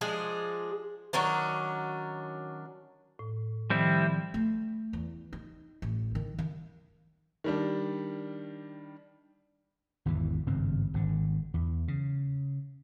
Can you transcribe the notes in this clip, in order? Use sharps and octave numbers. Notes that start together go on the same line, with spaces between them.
F3 G#3 D4 G#4
D#3 F#3 C#4 D4
A2
D#3 F3 G3 C4 E4
A3
E2
D#4
A1
D#3
D#3
D#3 G3 D4
G#1 E2 D3 E3
G#1 G2 C#3 C4
G#1 D3
E2
C#3